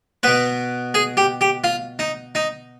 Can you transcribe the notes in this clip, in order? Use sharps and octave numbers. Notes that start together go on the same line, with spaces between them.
B2 B3 B4
G#4
G4
G4
F4
D#4
D#4